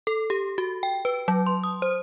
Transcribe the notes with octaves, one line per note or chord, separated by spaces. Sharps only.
A4
G4
F#4
G5
B4
F#3
C6
D#6
C5